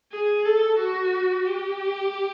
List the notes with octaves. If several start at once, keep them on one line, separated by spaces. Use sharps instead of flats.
G#4
A4
F#4
G4